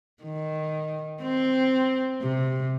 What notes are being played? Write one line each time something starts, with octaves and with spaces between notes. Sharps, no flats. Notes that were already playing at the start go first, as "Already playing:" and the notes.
D#3
C4
C3